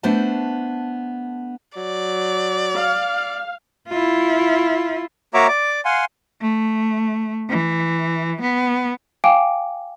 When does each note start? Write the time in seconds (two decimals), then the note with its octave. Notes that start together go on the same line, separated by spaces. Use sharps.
0.03 A3 B3 D4 C5 A5
1.77 F#3 D5
2.74 F5
3.89 E4 F4
5.34 A#3 F#4 C#5 E5 A#5 D6
5.48 D5 D6
5.85 F5 F#5 G#5 C6
6.41 A3
7.49 E3
8.42 B3
9.24 F5 G5 G#5 D6 D7